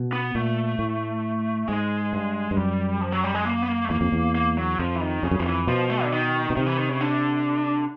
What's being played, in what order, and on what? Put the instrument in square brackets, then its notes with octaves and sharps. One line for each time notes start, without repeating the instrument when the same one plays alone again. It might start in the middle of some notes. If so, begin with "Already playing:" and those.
Already playing: [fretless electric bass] B2
[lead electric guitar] B3
[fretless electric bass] A#2 [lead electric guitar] A3
[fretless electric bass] A2
[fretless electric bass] G#2 [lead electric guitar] G#3
[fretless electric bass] G2
G2
[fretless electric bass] F#2 [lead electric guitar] G3
[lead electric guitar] F3
F#3
G3
G#3
A#3
B3
A#3
A3
[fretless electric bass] E2 [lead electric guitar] A#3
[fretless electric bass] F2
E2
[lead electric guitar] A#3
F#3
[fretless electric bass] F2 [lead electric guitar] F3
[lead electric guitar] E3
D#3
[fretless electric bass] F2 [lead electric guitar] C#3
[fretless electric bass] F#2
[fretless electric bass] F2 [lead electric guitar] F3
[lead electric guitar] E3
[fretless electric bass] B2 [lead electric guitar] F3
[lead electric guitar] A3
D3
D#3
[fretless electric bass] B2
[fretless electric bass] C3 [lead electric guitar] D#3
[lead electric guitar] E3
D#3
C#3
D3